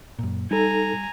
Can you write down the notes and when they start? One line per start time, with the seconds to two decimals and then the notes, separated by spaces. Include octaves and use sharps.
0.19 F#2 A#2
0.51 G3 D#4 A4 G#5 A#5